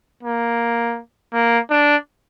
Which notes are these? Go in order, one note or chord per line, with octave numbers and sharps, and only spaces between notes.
A#3
A#3
D4